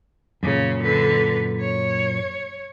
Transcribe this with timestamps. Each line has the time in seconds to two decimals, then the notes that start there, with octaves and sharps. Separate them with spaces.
0.43 F#2 A#2 C#3
0.83 D3 B4
1.60 C#5